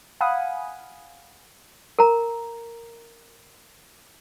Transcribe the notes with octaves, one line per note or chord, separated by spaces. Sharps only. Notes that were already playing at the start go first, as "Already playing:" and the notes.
F5 F#5 G#5 B5 D#6
A#4 A#5